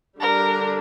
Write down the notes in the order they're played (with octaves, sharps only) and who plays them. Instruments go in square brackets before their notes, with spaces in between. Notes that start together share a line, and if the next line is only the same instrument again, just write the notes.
[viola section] D3 G3 D4 [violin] A#4